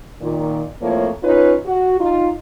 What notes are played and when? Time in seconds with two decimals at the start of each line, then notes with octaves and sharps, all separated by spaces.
0.21 A#2 D#3
0.81 F2 A2 F3 A3 A#3 C#5
1.23 C#4 D#4 F4 B4 C#5
1.65 F#4
2.00 D#4 F4